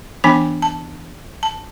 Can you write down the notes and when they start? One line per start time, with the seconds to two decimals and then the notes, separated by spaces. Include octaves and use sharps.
0.24 E3 B3 D4 G#5
0.62 A5
1.43 A5